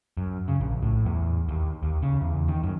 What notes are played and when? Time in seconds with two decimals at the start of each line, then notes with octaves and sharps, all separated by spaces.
0.17 F#2
0.48 C#3
0.61 A#1
0.83 A2
1.06 E2
1.49 D#2
1.83 D#2
2.02 C#3
2.21 E2
2.48 D#3
2.63 F#2